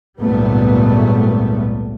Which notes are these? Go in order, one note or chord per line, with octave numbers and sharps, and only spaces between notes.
G#1 C#2 A#2 G3 A3 B3